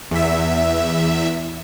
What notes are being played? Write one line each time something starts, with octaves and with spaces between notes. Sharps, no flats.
E2 E5